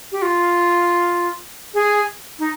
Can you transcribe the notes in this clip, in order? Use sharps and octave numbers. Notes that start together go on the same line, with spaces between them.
G4
F4
G#4
D#4